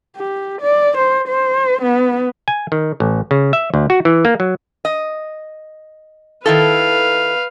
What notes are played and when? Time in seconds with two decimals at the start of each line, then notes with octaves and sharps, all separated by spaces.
0.16 G4
0.61 D5
0.97 C5
1.28 C5
1.82 B3
2.48 G#5
2.72 D#3
3.00 A1
3.31 C#3
3.53 E5
3.74 D2
3.90 F#4
4.05 E3
4.25 A#3
4.40 F#3
4.85 D#5
6.46 D#3 E4 A4 B4 F5